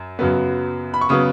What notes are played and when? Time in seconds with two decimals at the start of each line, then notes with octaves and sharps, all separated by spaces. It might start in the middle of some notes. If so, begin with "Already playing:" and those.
Already playing: F#2
0.19 F#2 C#3 F#3 B3
0.94 B5
1.01 C#6
1.09 C#3 F#3 B3 D#6